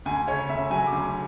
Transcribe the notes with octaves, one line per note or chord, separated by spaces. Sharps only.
D2 G#5
C#3 C#5
D2 E5
F#3 G#5
D6
D2